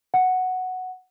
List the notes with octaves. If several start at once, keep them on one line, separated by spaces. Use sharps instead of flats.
F#5